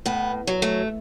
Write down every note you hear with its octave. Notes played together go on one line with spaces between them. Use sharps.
A2 B3
F#3
A3